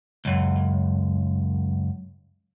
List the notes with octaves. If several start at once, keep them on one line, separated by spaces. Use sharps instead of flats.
C#2 F#2